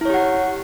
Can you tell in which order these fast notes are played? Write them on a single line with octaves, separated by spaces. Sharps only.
E4 C#5 G4 F#5